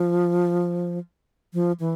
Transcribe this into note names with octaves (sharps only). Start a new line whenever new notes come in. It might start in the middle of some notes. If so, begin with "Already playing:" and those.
Already playing: F3
F3
E3